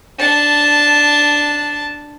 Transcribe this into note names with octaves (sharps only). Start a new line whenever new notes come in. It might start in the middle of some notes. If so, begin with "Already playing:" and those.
D4 A5